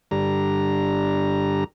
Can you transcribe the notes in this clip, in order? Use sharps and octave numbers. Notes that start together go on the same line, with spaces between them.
G2 D3 G3 A#5